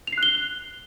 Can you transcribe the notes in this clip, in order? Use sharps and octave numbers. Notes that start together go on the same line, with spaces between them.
F7
C7
F#6
G7